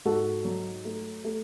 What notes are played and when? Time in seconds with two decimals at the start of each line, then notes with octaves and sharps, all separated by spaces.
0.05 G#2 F#4 A4
0.45 F#3
0.85 A3
1.25 A3